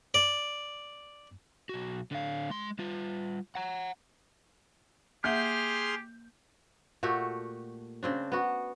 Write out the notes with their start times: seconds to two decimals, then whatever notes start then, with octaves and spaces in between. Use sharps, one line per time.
0.14 D5
1.69 B1 F#4
2.12 D3 F5
2.50 G#3 C6
2.79 G3 F4
3.55 F#5 A#5
5.24 A#3 G4 G#4 E5 F#5 C6 F6 G6
7.03 A#2 A3 F#4 G4
8.03 C#3 C4 D4
8.32 B3 F#4